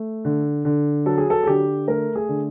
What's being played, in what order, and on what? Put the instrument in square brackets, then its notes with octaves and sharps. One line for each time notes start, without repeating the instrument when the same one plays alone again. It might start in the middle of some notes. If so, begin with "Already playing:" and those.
Already playing: [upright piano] A3
D3
D3
F#3 A4
G#4
A4
G#4
D3 G4
A3 A#4
G#4
D3